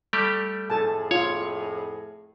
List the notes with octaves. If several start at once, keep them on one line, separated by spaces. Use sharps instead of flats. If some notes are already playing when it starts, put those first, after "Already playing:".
G3 A3 G4
F2 A2 G#4 A4 G#5 A5
F4 C#5